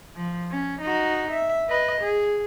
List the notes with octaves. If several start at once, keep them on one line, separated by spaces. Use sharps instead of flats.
F3
C#4
D#4 F#4
E5
B4 D#5
G#4